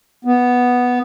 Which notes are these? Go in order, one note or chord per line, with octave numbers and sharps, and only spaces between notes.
B3